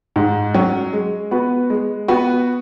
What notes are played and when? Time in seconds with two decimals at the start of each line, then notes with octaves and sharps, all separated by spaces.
0.16 G#2
0.54 F#3 C#4
0.93 G#3
1.31 B3 F#4 B4
1.70 G#3
2.08 B3 F#4 B4